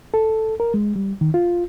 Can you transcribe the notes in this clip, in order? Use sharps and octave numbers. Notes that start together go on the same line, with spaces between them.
A4
A#4
G#3
G3
D#3
F4